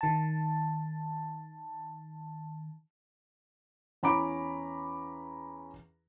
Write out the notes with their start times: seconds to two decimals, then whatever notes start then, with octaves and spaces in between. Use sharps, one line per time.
0.01 D#3 A5
4.03 E2 C#4 A#5 B5 D6 D7